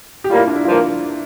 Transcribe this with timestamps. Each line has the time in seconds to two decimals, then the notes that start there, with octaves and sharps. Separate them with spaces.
0.24 G4
0.30 A2 G3 A#3 F4
0.38 E4
0.47 D4
0.55 E4
0.64 G2 F3 A#3 F4